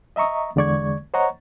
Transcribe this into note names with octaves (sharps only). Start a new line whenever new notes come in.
D#5 E5 A#5 C#6 D#6
E2 D3 G#3 D5 C#6 G#6
C5 C#5 D#5 F#5 A#5 C#6